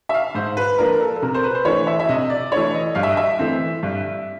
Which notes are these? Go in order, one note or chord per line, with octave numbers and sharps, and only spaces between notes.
E5
F5
G#2 C5
B4
F3 A#3 D4 A#4
A4
A4
C3 A#4
C5
B4
C5
E3 A3 D4 C#5
E5
E5
C3 D#5
D5
E3 A3 D4 C#5
D#5
G2 F5
E5
D#5
E5
E3 A3 C4
G2